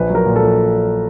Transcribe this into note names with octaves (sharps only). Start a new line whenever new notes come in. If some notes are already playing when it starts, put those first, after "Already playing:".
Already playing: A#1 B4
F#3 A#4
A#2
A#1 A4